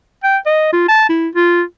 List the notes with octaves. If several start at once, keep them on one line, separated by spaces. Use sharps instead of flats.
G5
D#5
F4
A5
E4
F4